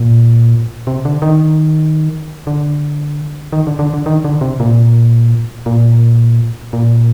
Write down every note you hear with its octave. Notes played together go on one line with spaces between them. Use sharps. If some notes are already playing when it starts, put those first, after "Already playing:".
Already playing: A#2
C3
D3
D#3
D3
D#3
D3
D3
D3
D#3
D3
C3
A#2
A#2
A#2